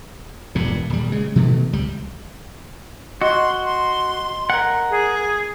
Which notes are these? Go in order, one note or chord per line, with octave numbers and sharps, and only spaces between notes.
E1 G2 A#2
D#1 G3
C#3 G#3
B2 D#3 E3 A3
C#2 G3
F#4 D#5 C6
C6
A#4 F#5
G#4